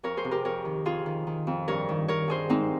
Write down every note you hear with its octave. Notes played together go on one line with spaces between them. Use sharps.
F2 A#4 C#5
G#4 C5
C3
G4 A#4
F2 A#4 C#5
D#3
F2 F4 G#4
D#3
D#3
F2
G2 A#4 C#5
D#3
D#3 A#4 C#5
G2 G#4 C5
G#2 C4 D#4